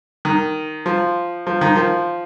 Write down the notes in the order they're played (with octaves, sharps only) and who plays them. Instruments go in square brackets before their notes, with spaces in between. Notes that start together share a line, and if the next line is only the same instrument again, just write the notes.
[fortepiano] D#3
F3
F3
D#3
F3